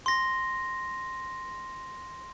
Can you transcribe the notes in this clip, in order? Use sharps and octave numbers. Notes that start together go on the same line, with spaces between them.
C6 A#6